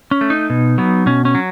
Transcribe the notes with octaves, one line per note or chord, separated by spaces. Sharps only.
C#4
A3
D#4
B2
F#3 B3
B2 C#4
C#4
F#3